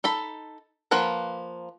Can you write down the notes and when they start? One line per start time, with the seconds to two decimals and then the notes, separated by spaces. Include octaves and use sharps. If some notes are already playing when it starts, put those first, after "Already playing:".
0.04 D#4 A4 B5
0.91 F3 A#3 B4 F#5 A#5